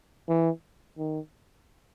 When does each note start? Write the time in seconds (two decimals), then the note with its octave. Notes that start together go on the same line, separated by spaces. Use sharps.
0.29 E3
0.98 D#3